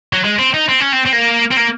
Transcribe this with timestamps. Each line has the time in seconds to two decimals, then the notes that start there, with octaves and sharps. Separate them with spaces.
0.13 F#3
0.24 G#3
0.39 C4
0.54 D#4
0.69 C4
0.80 C#4
0.92 C4
1.05 C4
1.13 A#3
1.51 C4
1.57 A#3